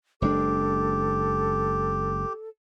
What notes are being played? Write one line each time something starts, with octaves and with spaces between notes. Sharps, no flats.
F#1 G#3 D4 G4 A4